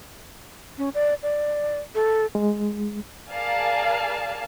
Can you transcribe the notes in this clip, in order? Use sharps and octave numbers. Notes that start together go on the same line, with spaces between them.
C#4
D5
D5
A4
G#3
G#4 A#4 D5 F5 G#5 A5